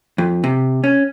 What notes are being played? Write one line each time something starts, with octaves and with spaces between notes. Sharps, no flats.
F2
C3
C#4